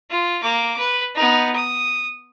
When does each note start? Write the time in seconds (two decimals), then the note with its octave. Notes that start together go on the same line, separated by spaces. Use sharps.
0.10 F4
0.42 A#3 D6
0.78 B4
1.15 B3 D#4
1.55 D#6